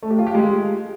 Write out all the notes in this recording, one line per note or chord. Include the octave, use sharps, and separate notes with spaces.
A3
G4
F4
G4
G#3